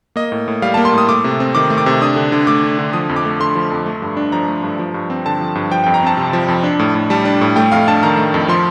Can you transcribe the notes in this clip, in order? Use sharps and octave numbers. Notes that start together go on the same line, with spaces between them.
A#3 D#5
A2
A2
G3 F5
A#3 A5
C6
A2
D#6
A3 D6
C3
C4
D#3 D6
A3
D6
C3
D4 D#6
D3
D3
A3 D6
D4
D3
F3 D#6
F2
D6
A3
D3 C6
F3
F2
A3
G2
D4
F3 A#5
A3
G2
F3
G2
C4
D3 A5
F3
G2
F3 G5
F2 G5
A#5
C4 A5
C3
F3
F2
D4
A2
A2
G3 A5
D4
A2
A3 G5
F2 F5
D4 A5
D#3 A#5
A3
F2
F3 C6